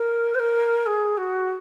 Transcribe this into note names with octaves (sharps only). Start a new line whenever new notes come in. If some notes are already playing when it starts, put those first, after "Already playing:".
Already playing: A#4
C5
A#4
G#4
F#4